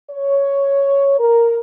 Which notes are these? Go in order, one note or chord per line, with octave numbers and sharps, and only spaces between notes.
C#5
A#4